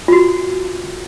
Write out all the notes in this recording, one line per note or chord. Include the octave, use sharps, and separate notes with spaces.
F4 F#4